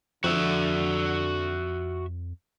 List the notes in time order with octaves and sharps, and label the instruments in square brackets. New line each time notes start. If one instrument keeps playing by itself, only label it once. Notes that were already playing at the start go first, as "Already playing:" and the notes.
[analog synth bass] F2 [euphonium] D3 [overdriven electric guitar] F#4 E5